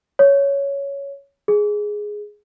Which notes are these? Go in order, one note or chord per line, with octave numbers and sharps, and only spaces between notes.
C#5
G#4